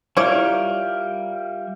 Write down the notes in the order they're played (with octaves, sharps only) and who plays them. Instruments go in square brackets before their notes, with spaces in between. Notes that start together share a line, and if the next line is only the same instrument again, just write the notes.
[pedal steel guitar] G3 A#4 [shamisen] E4 C#5 D5 [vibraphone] F4 E5 F5